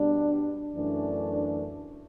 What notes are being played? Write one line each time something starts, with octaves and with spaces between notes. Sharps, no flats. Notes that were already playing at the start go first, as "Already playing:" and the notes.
Already playing: B2 G3 D4
F#2 E3 A3 D4